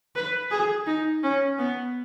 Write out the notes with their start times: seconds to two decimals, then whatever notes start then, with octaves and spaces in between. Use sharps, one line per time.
0.16 B4
0.51 G#4
0.86 D#4
1.23 C#4
1.58 B3